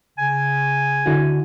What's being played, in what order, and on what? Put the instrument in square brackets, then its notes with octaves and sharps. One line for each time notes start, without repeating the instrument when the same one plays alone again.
[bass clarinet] C#3 [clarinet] G#5
[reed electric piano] D3 E4 F#4